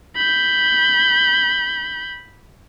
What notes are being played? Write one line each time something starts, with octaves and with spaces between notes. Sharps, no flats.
B5 G6